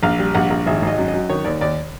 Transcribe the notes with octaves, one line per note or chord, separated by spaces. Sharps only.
A#1 F5
G3
A#1 F#5
A#1
G#1 E5
G#1 D#5
F#2
D#5
F#2
D#3 C#5
D#2 D5
D#2 D5